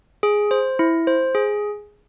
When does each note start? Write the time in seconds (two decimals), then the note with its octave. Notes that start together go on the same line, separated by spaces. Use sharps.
0.23 G#4
0.51 C5
0.79 E4
1.07 C5
1.35 G#4